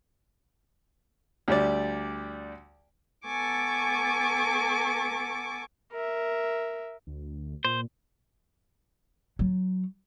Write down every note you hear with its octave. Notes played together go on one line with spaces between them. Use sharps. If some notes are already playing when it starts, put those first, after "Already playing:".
D2 G3 D5
B3 A4 G#5 C#6 D6
A#4 E5
D2
A#2 C5
F#3